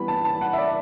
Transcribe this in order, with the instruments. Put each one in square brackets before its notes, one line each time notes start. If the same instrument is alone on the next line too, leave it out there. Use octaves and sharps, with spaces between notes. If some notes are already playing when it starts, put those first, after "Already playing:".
Already playing: [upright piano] E3 G3 B3 B5
A5
A5
F#5
E5
D5